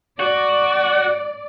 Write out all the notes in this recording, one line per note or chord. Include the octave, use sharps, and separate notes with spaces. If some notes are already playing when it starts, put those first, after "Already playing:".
F#4 D5